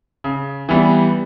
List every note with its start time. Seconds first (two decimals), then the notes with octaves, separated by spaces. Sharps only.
0.24 C#3
0.69 E3 G3 B3